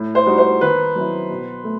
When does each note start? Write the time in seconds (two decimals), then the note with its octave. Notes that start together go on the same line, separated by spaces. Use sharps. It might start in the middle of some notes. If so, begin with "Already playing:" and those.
Already playing: A2
0.15 C5
0.26 G3 D#4 F#4
0.38 C5
0.61 D#3 B4
0.95 F#3 C4 E4
1.30 B2
1.64 A3